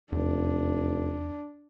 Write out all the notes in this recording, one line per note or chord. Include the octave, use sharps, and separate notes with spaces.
F1 E2 D4